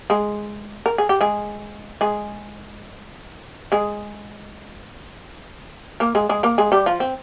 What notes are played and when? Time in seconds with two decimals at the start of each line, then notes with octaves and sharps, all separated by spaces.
0.10 G#3 G#4
0.86 A#4
0.98 G#4
1.09 G4
1.21 G#3 G#4
2.01 G#3 G#4
3.72 G#3 G#4
6.00 A#3 A#4
6.15 G#3 G#4
6.29 G#3 G#4
6.43 A#3 A#4
6.58 G#3 G#4
6.72 G3 G4
6.86 F3 F4
7.00 C4